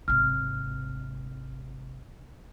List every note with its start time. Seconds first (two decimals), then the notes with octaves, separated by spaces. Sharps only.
0.08 G#1 C3 F6